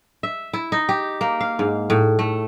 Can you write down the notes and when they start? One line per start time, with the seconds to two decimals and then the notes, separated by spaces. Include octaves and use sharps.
0.23 E5
0.53 E4
0.72 D#4
0.89 G4
1.21 A#3
1.41 F5
1.59 G#2
1.90 A2
2.19 A3